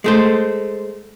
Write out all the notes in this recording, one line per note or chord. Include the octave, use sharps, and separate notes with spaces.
G#3 A3 C5